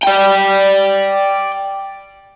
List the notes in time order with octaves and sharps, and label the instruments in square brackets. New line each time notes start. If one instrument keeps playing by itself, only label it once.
[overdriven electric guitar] D5 G5